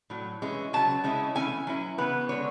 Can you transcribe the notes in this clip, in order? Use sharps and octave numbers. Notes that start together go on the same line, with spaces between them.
A2 F#3
E3 G#3 C#4
C#3 F#3 C#4 A5
C#3 G#3 C#4 E4
E3 A3 C#4 E4 G#5
F#3 C#4 E4
C#3 E3 B3 B4
D3 G#3 D4 C#5